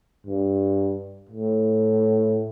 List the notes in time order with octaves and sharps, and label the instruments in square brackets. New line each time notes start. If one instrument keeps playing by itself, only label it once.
[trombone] G2
A2